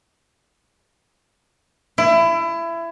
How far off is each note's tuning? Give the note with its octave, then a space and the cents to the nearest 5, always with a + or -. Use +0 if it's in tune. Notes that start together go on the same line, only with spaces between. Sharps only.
E4 +25